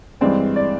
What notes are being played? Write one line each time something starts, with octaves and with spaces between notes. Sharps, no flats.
G2 E3 G#3 C4 D5
D5